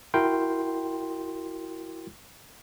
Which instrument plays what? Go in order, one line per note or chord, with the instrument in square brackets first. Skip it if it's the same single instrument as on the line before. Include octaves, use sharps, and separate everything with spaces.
[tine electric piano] E4 F#4 A#4 G5 C6